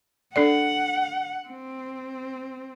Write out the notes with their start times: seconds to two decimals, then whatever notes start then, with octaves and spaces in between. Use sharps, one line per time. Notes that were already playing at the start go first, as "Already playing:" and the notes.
0.36 D4 A4 D5 F#5
1.48 C4